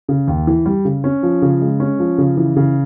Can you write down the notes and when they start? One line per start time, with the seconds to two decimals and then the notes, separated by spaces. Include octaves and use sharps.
0.09 C#3
0.28 D#2
0.47 E3
0.66 G3
0.85 C#3
1.04 C#4
1.23 F3
1.42 C#3
1.61 G#3
1.80 C#4
1.99 F3
2.18 C#3
2.37 E3
2.56 C#3